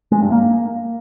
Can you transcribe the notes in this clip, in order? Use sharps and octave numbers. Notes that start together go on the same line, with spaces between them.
G#3
G2
A#3